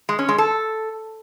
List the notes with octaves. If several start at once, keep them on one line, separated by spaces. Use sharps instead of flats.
G#3
C#4
G#3
A4